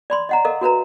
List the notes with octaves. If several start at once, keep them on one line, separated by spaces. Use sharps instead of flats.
D5 B5 C6
D#5 F#5 A#5
A4 A#4 D#5 F5
F#4 A#4 B4 A#5